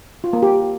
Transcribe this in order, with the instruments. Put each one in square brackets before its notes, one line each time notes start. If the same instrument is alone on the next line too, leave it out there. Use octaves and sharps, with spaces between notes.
[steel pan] F4
A#3
G4